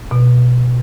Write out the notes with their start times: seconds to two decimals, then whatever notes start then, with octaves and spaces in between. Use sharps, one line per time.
0.11 B2